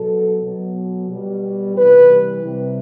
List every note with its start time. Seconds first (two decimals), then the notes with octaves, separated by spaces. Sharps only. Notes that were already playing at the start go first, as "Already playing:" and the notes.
Already playing: B2 F#3 A4
0.43 B2 F#3
1.10 B2 G3
1.77 C3 E3 G3 B4
2.44 C3 G3